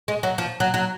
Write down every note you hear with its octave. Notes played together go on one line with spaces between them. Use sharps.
G#3
F#3
F3
F#3
F#3